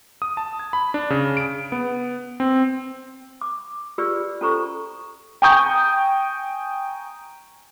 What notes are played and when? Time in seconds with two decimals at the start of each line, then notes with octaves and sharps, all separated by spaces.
0.22 D#6
0.37 A5
0.59 G#6
0.73 B5
0.94 D4
1.10 C#3
1.37 D7
1.72 B3
2.40 C4
3.41 D6
3.98 F4 G4 G#4 B4 D5 E6
4.41 C#4 F4 A4 C5 A#5 C#6
5.42 G5 G#5 A#5 C#6 D#6 G6